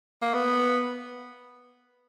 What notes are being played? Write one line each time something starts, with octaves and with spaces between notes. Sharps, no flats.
A#3
B3